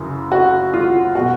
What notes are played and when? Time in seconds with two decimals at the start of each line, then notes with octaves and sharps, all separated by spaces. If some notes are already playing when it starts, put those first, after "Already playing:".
Already playing: F#2 C#3 E3
0.32 F#4
0.74 F4
1.15 B2 F#4